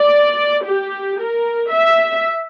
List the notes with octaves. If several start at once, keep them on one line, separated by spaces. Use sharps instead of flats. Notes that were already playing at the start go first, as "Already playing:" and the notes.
Already playing: D5
G4
A#4
E5